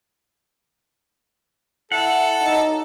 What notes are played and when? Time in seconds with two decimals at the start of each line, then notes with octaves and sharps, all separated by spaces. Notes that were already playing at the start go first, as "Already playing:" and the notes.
1.92 E4 A4 F#5
2.43 D#4